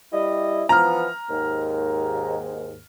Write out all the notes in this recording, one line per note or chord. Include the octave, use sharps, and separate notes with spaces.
G3 E4 D#5
E3 F3 B3 A#5 F6
D#2 G#2